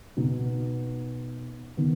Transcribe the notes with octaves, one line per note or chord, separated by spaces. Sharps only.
B2 B3 D#4
D#3 B3